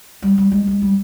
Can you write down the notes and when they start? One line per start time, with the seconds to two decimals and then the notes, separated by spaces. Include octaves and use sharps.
0.22 G3
0.38 G3
0.52 G#3
0.67 G#3
0.82 G3